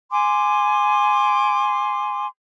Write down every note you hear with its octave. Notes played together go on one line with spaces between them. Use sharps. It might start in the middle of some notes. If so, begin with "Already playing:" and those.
G#5 C6 D6